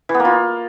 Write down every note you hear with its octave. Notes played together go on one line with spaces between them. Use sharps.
E3
B3
A#3
F4